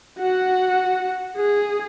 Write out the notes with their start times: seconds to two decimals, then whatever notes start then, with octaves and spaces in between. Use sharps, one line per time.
0.19 F#4 F#5
1.37 G#4